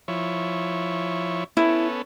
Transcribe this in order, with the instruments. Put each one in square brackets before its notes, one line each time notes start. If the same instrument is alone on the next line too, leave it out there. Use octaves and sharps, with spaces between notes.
[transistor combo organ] F3 E4 C#5
[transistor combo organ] B3 C#4 A4 [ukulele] E4